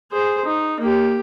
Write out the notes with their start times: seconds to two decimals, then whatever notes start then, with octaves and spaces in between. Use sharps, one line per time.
0.12 G#4 C5
0.45 D#4
0.80 A#3 G4